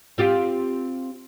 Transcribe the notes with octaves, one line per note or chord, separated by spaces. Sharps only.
C4 F4 G4